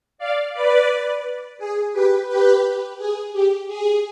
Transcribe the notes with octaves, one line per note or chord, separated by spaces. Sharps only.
D5 F5
B4 D5
G#4
G4 B4
G4 B4
G#4
G4
G#4